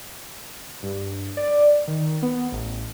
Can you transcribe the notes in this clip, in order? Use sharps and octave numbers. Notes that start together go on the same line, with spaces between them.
G2
D5
D#3
B3
A1